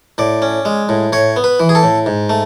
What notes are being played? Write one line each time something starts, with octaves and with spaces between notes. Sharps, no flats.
A2 D5
C#4
G#3
A2
A2 C#5
B3
B4
E3
G#4
A4
A2
G#2
A3